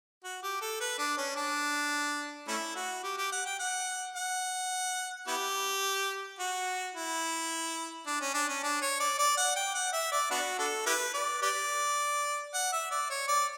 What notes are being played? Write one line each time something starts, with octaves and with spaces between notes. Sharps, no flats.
F#4
G4
A4
B4
D4
C#4
D4
A3 C#4 E4
F#4
G4
G4
F#5
G5
F#5
F#5
B3 E4 G4
F#4
E4
D4
C#4
D4
C#4
D4
C#5
D5
D5
F#5
G5
F#5
E5
D5
B3 D4 F#4
D4 F#4 A4
E4 G4 B4
D5
G4 B4 D5
F#5
E5
D5
C#5
D5